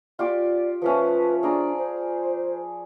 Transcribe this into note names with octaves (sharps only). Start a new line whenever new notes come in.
F4 G4 D5 D6
F3 A3 C#4 B4
D4 G#4 D5 A#5
C5